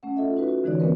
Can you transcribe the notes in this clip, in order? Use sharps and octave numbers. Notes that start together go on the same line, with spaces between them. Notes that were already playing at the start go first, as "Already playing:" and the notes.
A3 C#4 F#5
F4 A4 D#5 E5
D#4 F#4 B4
F#4
D3 E3 G#3 D#4 C#5 D5
A#3 C4 A#4 B4